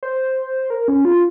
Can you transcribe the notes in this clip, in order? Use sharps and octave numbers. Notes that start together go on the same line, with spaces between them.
C5
A#4
C#4
F4